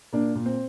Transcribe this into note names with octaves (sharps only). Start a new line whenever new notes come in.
A#2 A#3 D4
A#2
C4